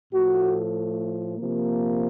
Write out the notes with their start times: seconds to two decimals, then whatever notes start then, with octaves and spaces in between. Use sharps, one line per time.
0.12 A2 F3 A3 F#4
1.36 C3 F3 A#3